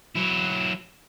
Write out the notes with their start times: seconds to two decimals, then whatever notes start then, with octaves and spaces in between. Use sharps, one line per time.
0.16 F#3 E4